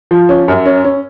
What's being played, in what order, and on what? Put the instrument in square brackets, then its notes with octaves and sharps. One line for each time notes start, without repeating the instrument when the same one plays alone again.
[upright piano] F3
C#4
F#2
C#4
C#4